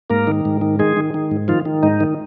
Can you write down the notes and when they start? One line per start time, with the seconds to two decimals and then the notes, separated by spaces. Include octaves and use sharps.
0.10 G#2 A#3 A#4
0.27 D#3
0.45 G#2
0.61 D#3
0.79 D#3 G#3 G#4
0.97 D#3
1.14 D#3
1.31 G#2
1.48 D#3 F3 F4
1.65 D#3
1.83 G#2 D#4
2.00 D#3